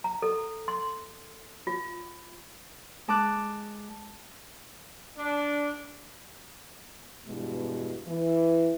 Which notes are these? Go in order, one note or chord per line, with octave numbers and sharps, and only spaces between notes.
A#5
A4
C6
F4
G#3 A5 D6 F#6
D4
E2 G2 B2 G#3
E3